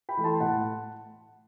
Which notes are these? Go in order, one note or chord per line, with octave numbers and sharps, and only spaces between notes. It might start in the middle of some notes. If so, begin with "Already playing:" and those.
G5 B5
E3 A3
A5 C6
A2 F#5 A5